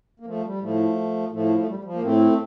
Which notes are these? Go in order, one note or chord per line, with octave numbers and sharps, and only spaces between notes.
A#3
F3 A3
G3
A2 F3 A3
A2 F3 A3
A3
G3
G3
F3
A#3
A2 A3 C4